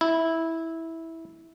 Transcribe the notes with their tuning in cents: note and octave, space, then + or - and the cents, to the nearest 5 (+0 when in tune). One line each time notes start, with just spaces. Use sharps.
E4 -10